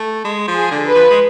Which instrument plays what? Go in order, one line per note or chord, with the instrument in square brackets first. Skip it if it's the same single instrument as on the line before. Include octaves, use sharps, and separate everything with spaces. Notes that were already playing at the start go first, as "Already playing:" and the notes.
Already playing: [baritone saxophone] A3
G#3
F3
[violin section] G#4
[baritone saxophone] D3
[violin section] B4
[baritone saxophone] F3
G#3